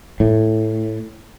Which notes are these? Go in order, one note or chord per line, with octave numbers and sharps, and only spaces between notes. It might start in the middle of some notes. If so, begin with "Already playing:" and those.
A2